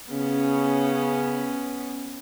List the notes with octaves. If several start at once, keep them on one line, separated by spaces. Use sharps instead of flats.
C#3 B3 C#4